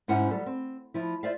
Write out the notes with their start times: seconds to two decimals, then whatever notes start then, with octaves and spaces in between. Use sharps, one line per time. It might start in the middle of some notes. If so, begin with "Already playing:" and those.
0.08 G#2 C#4 D#4 E4 C5 F#5
0.29 F#3 G3 A4
0.46 C4
0.94 F3 E4
1.23 F4 C5 D5 E5 F5